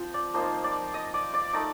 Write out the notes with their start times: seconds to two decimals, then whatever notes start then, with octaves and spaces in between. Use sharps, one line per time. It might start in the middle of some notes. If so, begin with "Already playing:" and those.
Already playing: F3 C4 F4 C5 A5
0.14 D5 D6
0.34 F3 A#3 D#4 C5 C6
0.64 D5 D6
0.94 D#5 D#6
1.14 D5 D6
1.34 D5 D6
1.53 A3 D#4 D5 D6